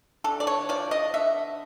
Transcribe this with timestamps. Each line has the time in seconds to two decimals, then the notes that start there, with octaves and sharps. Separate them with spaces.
0.24 D3 A4
0.40 D5
0.47 C#5
0.69 F3 D5
0.91 D#5
1.14 D3 E5